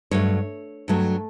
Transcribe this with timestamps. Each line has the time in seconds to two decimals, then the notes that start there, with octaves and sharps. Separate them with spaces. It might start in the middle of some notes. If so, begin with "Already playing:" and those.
0.11 G2 F#3 A3 C#5
0.88 G2 F#3 A3